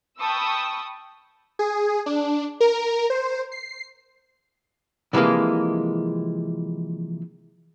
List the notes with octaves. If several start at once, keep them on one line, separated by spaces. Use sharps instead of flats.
G5 A5 B5 C#6 D#6 E6
G#4
D4
A#4
C5
C7
C3 E3 F3 G#3 A#3